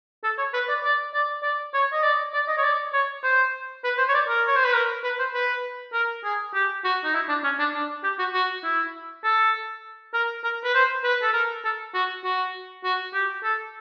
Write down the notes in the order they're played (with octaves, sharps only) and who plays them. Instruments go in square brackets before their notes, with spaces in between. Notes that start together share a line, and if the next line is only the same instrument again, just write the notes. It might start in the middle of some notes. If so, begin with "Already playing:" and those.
[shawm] A4
C#5
B4
D5
D5
D5
D5
C#5
D#5
D5
D5
D#5
C#5
D5
C#5
C5
B4
C5
C#5
D5
A#4
C#5
C5
B4
A#4
B4
C5
B4
A#4
G#4
G4
F#4
D#4
E4
D4
C#4
D4
D4
G4
F#4
F#4
E4
A4
A#4
A#4
B4
C5
B4
A4
A#4
A4
F#4
F#4
F#4
G4
A4